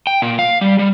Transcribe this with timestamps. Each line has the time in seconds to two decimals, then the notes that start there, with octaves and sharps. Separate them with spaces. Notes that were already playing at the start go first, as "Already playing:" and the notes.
0.07 G5
0.22 A#2
0.39 F5
0.61 G3
0.79 G3